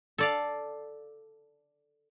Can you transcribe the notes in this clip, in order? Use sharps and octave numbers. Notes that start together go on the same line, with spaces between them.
A4 D5 F5